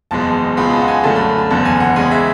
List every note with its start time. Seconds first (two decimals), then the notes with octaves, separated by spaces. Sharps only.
0.11 F#1 E2 B2 G#3 A5
0.57 C#2 B2 G#3 B5
0.73 A5
0.81 F#5
0.88 G#5
1.04 F#2 D3 A3 A5
1.16 B5
1.38 A5
1.50 F#1 E2 D3 A5
1.65 G#5
1.80 F#5
1.96 E2 C#3 G#3 G#5
2.11 E5